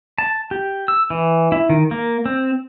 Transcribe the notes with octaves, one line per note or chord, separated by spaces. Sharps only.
A5
G4
E6
E3
E4
D#3
A#3
C4